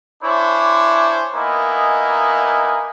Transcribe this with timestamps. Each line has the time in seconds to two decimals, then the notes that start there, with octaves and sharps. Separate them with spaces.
0.23 D4 E4 C5 C#5 G#5 D6
1.34 A#3 B3 D#4 E4 D#5 G#5